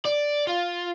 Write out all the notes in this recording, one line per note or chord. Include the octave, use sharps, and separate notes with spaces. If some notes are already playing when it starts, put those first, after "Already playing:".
D5
F4